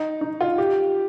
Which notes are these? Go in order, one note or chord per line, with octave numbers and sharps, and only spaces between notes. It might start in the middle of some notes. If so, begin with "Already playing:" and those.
Already playing: D#4
D#4
F4
G4